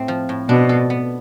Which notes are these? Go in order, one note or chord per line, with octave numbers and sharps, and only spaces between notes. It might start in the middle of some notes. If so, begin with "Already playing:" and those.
Already playing: A2 A3 C4
F3
A2
B2 D4
A4
B3